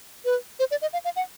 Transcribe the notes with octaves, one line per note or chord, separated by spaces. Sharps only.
B4
C5
D5
D#5
F5
F5
F#5